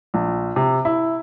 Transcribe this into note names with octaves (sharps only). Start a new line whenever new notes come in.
A#1
C3
E4